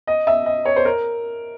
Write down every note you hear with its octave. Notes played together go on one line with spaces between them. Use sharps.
D#5
E5
D#5
C#5
C5
A#4